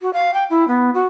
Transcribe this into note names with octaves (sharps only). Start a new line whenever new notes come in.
F#4
F5
G5
E4
B3
F#4